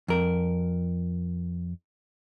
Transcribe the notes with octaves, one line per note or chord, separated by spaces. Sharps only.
F2 A#4